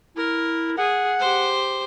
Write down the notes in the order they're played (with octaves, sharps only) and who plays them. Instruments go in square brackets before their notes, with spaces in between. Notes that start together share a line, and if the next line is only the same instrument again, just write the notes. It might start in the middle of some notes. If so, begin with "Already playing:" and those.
[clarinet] E4 [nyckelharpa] A#4
[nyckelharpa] G#4 [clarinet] F#5
[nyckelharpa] G4 C5